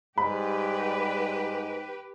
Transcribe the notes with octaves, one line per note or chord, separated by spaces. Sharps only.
G#2 G3 G4 B4 B5